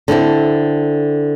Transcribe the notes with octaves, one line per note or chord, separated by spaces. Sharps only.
D3 C4 E4 A4